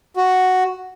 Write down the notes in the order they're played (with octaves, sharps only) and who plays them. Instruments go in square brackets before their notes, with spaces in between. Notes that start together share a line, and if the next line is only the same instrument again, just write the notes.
[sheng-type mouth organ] F#4